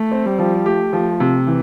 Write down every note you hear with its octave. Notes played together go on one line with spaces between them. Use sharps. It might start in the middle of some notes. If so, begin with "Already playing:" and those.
Already playing: A3
C4
G3
F3
A3 G4
F3
C3
E3